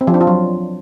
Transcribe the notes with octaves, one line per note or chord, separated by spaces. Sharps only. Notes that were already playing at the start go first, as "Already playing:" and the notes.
C4
F3
D4
F4
F#3